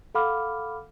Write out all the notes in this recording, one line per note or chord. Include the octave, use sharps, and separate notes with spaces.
A4 F5 F#5 B5 D6 F6